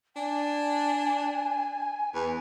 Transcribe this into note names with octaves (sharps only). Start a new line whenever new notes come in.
D4 G#5
E2 B4